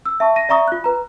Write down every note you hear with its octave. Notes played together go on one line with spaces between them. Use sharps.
E6
E5 A5 C#6
A#6 D#7
D5 E5 A#5 C#6 D#6
F4 F#6
B4 A#5